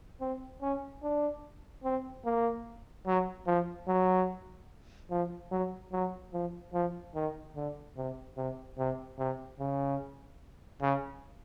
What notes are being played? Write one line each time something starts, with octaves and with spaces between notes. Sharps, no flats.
C4
C#4
D4
C4
A#3
F#3
F3
F#3
F3
F#3
F#3
F3
F3
D#3
D3
C3
C3
C3
C3
C#3
C#3